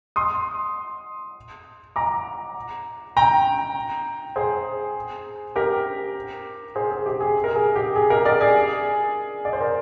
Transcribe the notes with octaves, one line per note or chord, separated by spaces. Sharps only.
C6 D#6
A#5 D6
G5 A#5
G#4 C5
G4 A#4
G#4 C5
G#4
G4
G#4
A#4
G#4
G4
G#4
G4 A#4
A#4 D5
G#4
D5
C5
A#4